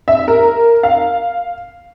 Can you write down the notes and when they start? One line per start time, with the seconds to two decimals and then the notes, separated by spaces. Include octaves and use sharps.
0.08 E5
0.28 A#4
0.83 F5